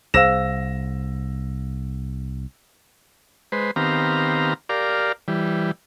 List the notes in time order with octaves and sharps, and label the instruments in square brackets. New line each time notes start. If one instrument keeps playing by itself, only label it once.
[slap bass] C2 [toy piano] G#4 C5 F5 [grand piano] E6 A#6 E7
[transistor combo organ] G#3 B4 C5
D#3 B3 C4 G4 F5 A#5
G4 A#4 D5 F5
E3 G3